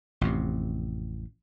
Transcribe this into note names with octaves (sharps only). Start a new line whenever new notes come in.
A1 F2 C3